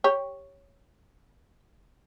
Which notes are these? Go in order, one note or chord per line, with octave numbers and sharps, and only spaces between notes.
G4 C#5